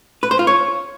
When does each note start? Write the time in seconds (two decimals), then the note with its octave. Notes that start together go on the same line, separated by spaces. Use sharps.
0.23 B4
0.31 C5
0.39 F4
0.47 C#5